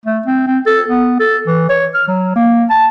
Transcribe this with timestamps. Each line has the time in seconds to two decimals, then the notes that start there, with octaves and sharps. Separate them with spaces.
0.06 A3
0.26 C4
0.47 C4
0.66 A4
0.88 B3
1.20 A4
1.47 E3
1.69 C#5
1.94 F6
2.08 F#3
2.36 A#3
2.70 A5